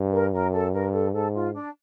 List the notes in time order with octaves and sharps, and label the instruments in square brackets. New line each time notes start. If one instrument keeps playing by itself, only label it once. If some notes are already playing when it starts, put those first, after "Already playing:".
Already playing: [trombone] G2
[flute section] A#4
[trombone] F#2 [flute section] A#4
[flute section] A4
[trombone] G2 [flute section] A#4
[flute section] A4
[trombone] G#2 [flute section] A4
[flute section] F4
D4